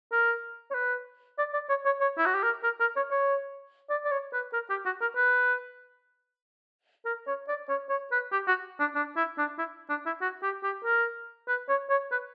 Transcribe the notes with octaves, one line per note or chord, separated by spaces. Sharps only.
A#4
C#5
B4
D5
D5
C#5
C#5
C#5
E4
F#4
G4
A#4
A#4
A#4
C#5
C#5
D5
D5
C#5
B4
A#4
G4
F#4
A#4
B4
A#4
C#5
D5
C#5
C#5
B4
G4
F#4
D4
D4
E4
D4
E4
D4
E4
F#4
G4
G4
A#4
B4
C#5
C#5
B4